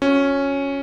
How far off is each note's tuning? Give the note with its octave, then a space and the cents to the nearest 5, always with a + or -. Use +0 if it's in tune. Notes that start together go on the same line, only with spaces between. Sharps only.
C#4 +0 F#4 -35